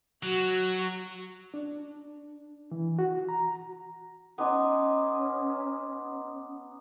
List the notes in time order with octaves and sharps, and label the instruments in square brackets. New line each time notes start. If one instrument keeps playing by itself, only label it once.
[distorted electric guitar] F#3 [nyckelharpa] F#4
[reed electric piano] D4
E3
F#4
A#5
[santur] B3 D#4 G#5 [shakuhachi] C#4 [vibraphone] C6 D6